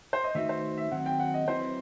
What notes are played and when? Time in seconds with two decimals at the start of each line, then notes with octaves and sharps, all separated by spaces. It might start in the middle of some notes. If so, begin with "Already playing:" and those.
0.13 C5
0.24 D#5
0.35 D#3 A3 D#4 F#4 B4 E5
0.49 C5
0.77 E5
0.91 D#3 F#3 C4 F#5
1.06 G5
1.20 F#5
1.34 D#5
1.48 F#3 C4 E4 B4 C5